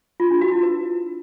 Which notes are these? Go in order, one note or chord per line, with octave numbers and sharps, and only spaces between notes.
F4
D4
F#4
E4
B4